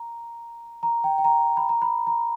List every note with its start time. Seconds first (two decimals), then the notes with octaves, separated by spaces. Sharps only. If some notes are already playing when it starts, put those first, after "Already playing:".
Already playing: A#5
0.83 A#5
1.04 G5
1.18 G5
1.24 A#5
1.57 B5
1.69 A#5
1.82 B5
2.07 A#5